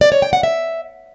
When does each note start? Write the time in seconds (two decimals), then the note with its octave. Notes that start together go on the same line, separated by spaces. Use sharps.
0.01 D5
0.12 C#5
0.22 G5
0.33 F#5
0.43 E5